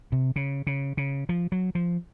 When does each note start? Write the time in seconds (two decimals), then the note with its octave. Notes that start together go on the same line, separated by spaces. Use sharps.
0.12 C3
0.36 C#3
0.67 C#3
0.97 C#3
1.29 F3
1.52 F#3
1.75 F3